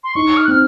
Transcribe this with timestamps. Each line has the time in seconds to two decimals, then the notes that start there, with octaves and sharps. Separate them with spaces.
0.04 C6
0.15 D#4 C#6
0.37 F6
0.44 F#6
0.48 C4 F6